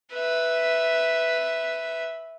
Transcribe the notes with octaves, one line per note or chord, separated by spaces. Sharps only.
B4 E5